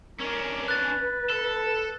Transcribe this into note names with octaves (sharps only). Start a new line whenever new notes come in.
C#4 D4 A#4
B4 F#6 A6
A4